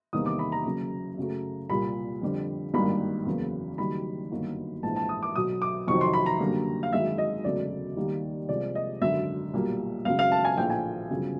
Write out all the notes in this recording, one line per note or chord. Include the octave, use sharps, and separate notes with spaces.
E2 C3 D#3 G3 A#3 D#6
D6
B5
A#5
F#1 F#2 C#3
F#2 C#3 F#3 A3
C2 A#2 G3 A#3 B5
F2 D3 G3
G#1 G2 D#3 G3 A#3 B5
F#1 E2 C#3 F#3 A#3
F#1 F#2 D#3 G3 B5
G1 F#2 D#3 F#3 A#3
A#1 G#2 E3 A5
A5
D#6
D6
B1 B2 F#3 D#6
D6
F2 C3 D#3 F#3 C#6
C6
B5
A#5
F#2 D3 G3 A#3
F5
G#1 F#2 D#3 G#3 E5
D#5
E1 D2 C#3 F#3 A3 D5
D#2 D#3 G3 A#3
C2 C3 F3 G#3 D5
D#5
G#1 F#2 D3 E5
B1 A#2 G3 A#3
G#1 F#2 C#3 F5
F5
A5
G#5
A#1 A2 F3 A3 G5
G#5
G1 F#2 C#3 F3